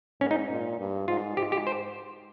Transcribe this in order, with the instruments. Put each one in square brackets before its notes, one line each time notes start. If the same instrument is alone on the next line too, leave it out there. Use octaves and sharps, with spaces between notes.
[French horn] G#2 [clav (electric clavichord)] C#4
[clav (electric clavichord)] D#4
[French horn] A#2
G2
[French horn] G#2 [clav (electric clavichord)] F4
[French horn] G#2 [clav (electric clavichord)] G4
[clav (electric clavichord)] G4
C5